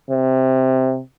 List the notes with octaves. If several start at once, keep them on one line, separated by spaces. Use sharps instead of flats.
C3